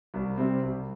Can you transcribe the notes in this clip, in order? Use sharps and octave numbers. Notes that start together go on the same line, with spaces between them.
C2
C3 G3 C4
C2